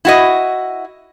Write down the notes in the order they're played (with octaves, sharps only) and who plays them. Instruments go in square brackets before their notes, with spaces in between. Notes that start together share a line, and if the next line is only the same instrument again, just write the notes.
[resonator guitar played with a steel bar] E4 F#4 D#5